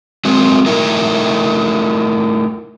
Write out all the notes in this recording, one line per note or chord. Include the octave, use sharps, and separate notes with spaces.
F#3 G#3 A#3 C4
A3 D#4 E4 A#4